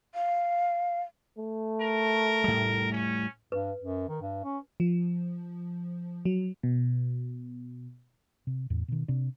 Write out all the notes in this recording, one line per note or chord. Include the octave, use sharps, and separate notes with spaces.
F5
A3
A#4
A2 G3
C#4
G2 B4
F#2
D#3
G2
C#4
F3
F#3
B2
C3
E2 A2
B2 D#3
C3 D4